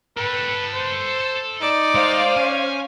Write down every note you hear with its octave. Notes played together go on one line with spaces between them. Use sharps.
A4 B4 G5
C5
D#4 D5
G#3 C5 F5
C#4 G#5